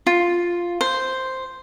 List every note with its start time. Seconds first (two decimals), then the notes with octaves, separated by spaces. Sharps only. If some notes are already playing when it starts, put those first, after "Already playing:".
0.07 F4
0.81 C5